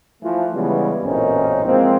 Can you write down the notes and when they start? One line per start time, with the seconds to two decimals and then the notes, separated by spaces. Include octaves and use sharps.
0.23 E3 F3 A3
0.53 C#3 E3 G3 G#3 B3
1.03 A1 F#2 A#2 C4 C#4 D#4
1.65 F3 G#3 A#3 C4